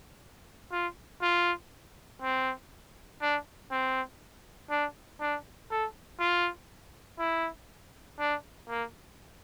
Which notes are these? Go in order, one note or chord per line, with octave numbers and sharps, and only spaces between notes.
F4
F4
C4
D4
C4
D4
D4
A4
F4
E4
D4
A#3